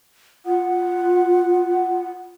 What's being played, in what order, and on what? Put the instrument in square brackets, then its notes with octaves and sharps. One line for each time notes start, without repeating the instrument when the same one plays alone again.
[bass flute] F4 [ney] F#5